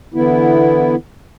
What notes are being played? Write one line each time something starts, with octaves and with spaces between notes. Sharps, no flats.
D3 E3 B3 E4